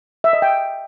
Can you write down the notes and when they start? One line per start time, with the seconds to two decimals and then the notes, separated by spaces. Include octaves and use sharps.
0.24 E5
0.33 D#5
0.42 G5